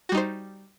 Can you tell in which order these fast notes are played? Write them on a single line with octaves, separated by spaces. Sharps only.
F#4 G3 D#4 C5